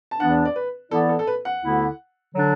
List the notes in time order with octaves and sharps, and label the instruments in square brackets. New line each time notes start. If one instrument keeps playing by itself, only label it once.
[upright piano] A5
[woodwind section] E2 E3 B3 D4 [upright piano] F#5
[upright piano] D5
B4
[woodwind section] E3 B3 E4 D5 [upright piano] A4
[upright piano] A4
A4
B4
F#5
[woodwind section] D2 D3 B3 E4
D3 F#3 D4